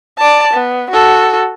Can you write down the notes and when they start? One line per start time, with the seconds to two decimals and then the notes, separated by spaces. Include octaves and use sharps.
0.18 D5 A5
0.54 B3
0.91 F#4 A4